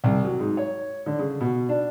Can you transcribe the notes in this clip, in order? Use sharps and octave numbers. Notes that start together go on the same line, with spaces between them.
C2
F#3
G#2
C#5
D3
C#3
B2
D4